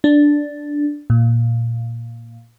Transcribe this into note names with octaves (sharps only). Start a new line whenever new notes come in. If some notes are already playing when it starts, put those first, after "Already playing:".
D4
A#2